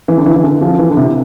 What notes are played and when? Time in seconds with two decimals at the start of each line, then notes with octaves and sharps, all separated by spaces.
0.08 E3
0.18 D3
0.26 E3
0.36 E3
0.43 D3
0.61 F3
0.79 E3
0.91 D3
0.97 C3